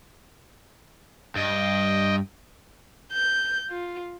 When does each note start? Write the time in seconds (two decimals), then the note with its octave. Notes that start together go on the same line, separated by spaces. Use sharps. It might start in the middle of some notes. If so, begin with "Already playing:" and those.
1.36 G2 D#5 G5
3.13 G6
3.70 F4